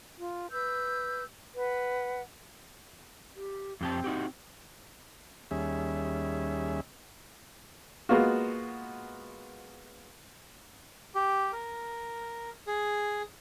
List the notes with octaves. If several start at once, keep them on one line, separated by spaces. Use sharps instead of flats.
F4
B4 E6 G6
B4 F#5
G4
F2 C4 G4 A5
D#4 F#4 G4
D#2 G3 C#4 G#4 E5
G#3 A#3 B3 F4 F#4
G4
A#4
G#4